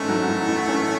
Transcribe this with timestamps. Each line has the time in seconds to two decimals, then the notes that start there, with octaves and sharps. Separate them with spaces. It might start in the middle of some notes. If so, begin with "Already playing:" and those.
Already playing: G#1 G#2 A3 C#4
0.09 F#3
0.28 A2
0.48 A1
0.68 C#4